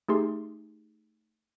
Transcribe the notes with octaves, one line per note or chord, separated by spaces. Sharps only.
A3 D#4 G4 G#4 C6